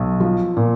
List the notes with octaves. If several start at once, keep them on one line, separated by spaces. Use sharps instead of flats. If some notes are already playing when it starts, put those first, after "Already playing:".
Already playing: B1
F3
A#2